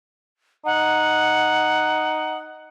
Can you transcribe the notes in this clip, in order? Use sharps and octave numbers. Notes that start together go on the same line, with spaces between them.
D#4 F#5